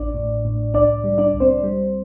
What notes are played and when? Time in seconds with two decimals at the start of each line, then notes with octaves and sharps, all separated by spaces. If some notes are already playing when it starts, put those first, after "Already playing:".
Already playing: A1 D4 D5
0.14 A2
0.45 A2
0.74 C2 D4 D5
1.04 G3
1.18 D4 D5
1.33 C2
1.40 C4 C5
1.63 G3